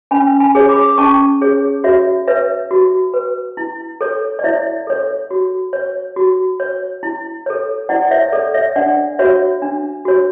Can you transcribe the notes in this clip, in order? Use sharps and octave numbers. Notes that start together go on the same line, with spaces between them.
C#4 G#5 B5
G#5 B5
G#4 C#5
B5 D6
C#4 A5 C#6
G#4 C#5
F#4 C#5 E5
B4 C#5 E5
F#4
B4
E4
A4 C#5
D5
E4 C#5 E5
A4 C#5
F#4
C#5
F#4
C#5
E4
A4 C#5
E4 D5 F#5
C#5 E5
A4 C#5 D5
C#5 E5
D4 D5 F#5
F#4 C#5 E5
D4
F#4 C#5